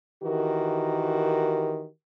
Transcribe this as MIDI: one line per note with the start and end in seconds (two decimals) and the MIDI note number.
0.22 1.87 51
0.22 1.87 52
0.22 1.87 66
0.22 1.87 67
0.22 1.87 70